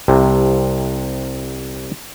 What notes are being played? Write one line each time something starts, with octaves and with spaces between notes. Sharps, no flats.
C2 C3